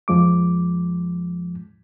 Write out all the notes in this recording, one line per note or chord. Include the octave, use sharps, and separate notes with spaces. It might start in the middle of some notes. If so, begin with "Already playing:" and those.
F2 F3 G#3 D6